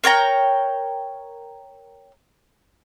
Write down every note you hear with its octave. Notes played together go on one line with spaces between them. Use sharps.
A#4 C#5 G5 A#5